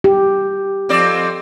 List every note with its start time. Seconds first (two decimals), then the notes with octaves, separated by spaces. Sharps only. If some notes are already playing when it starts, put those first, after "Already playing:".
0.04 G4
0.89 F2 C4 D5